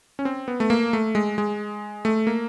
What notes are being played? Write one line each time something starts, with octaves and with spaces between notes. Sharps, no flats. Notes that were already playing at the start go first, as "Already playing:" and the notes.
C#4
C4
B3
A3
A#3
A3
G#3
G#3
A3
A#3